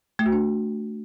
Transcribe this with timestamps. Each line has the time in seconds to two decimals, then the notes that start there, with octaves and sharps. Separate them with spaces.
0.19 A3
0.26 F#4
0.32 D4